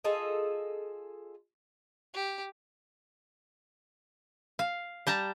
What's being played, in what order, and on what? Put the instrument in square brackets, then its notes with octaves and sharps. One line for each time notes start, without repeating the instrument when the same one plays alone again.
[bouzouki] F4 G#4 A4 D#5
[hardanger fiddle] G4
[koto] F5
G3 A5 A#5